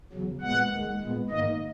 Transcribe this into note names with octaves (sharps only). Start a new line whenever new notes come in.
E2 C#3 F#3
A#2 G#3 B3 F#5
D#2 D#3 G#3
A#2 G#3 B3
G#2 D#3 A#3 D#5